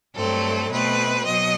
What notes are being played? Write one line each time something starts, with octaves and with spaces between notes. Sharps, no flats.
G2 F#3 A3 C4 A4
B2 A3 C4 B4
B2 F#3 D#5